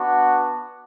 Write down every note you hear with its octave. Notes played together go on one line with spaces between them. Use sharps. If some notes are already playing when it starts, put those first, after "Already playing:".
Already playing: B3 D4 F#4